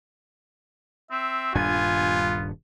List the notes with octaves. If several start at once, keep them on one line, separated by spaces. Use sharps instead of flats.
C4 E5
D#1 G2 B3 D4 F4 G#5